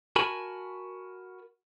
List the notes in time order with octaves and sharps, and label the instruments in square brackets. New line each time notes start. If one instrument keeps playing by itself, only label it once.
[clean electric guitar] F#4 A#4 G#5 A5 B5